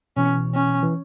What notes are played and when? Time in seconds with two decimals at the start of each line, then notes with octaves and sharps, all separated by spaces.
0.17 B2 E3 C#4
0.55 C#4
0.83 E3